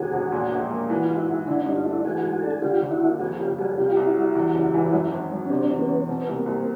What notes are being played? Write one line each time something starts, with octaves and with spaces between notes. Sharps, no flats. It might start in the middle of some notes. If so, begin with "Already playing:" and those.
Already playing: E1 D#2 F#4 G#4
E1
A#2
A#1
A#3
E3 F#4
F4
G#2
E4 F#4
G#2
D3 D4 E4
G2 C#4 D#4
D#4 F4
A3
D4 E4
E3 F#4 G#4
G#2
D4 A4
G#4
D3 F4 G4
D#2
E4 F#4
A#3
F2 F#4 G#4
F#1 F4 G4
G3 F#4 G#4
C3 F4 G4
C2
E4 F#4
G3
E2
F#1
E3
F#2
G#1
F#3
C#4
C3 C4 D4
E2
B3 C#4
E2
B2 C4
B3
C2
A#3 C4
C2